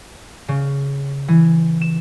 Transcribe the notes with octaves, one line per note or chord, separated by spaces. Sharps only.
C#3
E3
E7